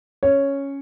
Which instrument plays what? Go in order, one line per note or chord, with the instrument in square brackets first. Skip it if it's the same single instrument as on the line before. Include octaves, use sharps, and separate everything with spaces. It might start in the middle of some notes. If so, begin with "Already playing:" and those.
[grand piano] C#4 C#5